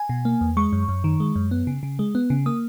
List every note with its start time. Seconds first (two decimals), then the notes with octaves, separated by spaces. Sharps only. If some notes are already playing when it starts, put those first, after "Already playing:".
Already playing: G#5
0.09 B2
0.25 A#3
0.41 E2
0.57 G#3 C#6
0.73 F#2
0.88 F#2
1.04 D#3
1.20 G#3
1.36 F#2
1.51 B3
1.67 C#3
1.83 C#3
1.99 G#3
2.15 B3
2.30 C#3
2.46 A#3 D#6